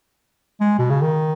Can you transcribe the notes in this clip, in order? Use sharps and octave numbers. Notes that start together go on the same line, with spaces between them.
G#3
B2
C#3
D#3